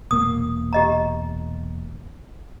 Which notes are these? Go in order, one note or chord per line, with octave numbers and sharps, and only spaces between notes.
E1 A#2 A#3 D#6
G4 D#5 A#5